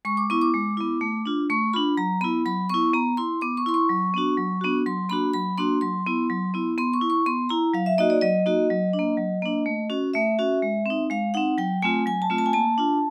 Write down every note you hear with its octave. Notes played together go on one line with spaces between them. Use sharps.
G#3 C#6
D6
B3 E4 C#6
D6
G#3
B3 E4
A3
D4 F4
A3 C#6
D4 F4 B5
F#3 A#5
B3 E4 B5
F#3 B5
B3 E4 C#6
B3 A#5
E4 C6
B3 D6
C#6
E4 C6
C#6
F#3
B3 D4 F#4
F#3
B3 D4 F#4
F#3 C6
A#3 D4 F#4 B5
F#3 B5
A#3 D4 F#4 C6
F#3 C6
B3 E4
F#3
B3 E4
B3 C6
C#6
E4
C#6
B3 C6
E4 A#5
F#3 F5
E5
A#3 D#4 F#4 D#5
D5
F#3 D#5
A#3 D#4 F#4
F#3
D4
A#3
F#3
A#3 D4
A3
C#4 F#4
A3 E5
C#4 F#4
G#3
C4 D#4
G#3 F5
C4 D#4 F#5
F#3 G5
A3 C4 F4 G#5
F#3 G#5
A5
A3 C4 F4
A5
G#5
A#3 A5
D4 F4